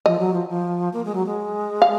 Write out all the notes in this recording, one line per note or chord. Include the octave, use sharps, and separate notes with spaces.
F3 D#5
F#3
F3
F3
A#3
G#3
F#3
G#3
F5